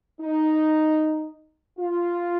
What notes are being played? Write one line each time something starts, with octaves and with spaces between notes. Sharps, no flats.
D#4
F4